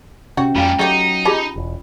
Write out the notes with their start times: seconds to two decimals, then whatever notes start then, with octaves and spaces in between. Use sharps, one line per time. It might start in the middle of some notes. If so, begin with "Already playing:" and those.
0.37 C3 C#4 F#4
0.55 F2 A#2 G3 G#3 F4 F5 G5
0.79 F#3 A3 D#4 G4
1.25 F4 G4 G#4 A5 B5
1.56 E1